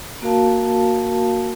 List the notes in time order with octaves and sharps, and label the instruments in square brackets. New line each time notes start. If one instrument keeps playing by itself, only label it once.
[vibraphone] A#3 F#4 A#4 F5 A5